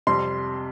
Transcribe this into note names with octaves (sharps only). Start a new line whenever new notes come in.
F2 C3 G3 C6